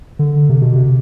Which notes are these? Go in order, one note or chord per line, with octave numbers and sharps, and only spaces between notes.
D3
C3
B2
C3